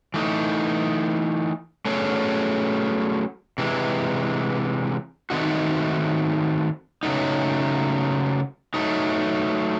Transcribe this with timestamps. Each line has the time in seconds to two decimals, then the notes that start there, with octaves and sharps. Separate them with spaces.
0.14 E3 A3 D#4
1.85 F#3 A3 C#4 G#4
3.58 C3 E3 G#3
5.30 D#3 A3 C4 D#4 F#4
7.03 C#3 F#3 A3 D#4
8.74 F#3 A3 D#4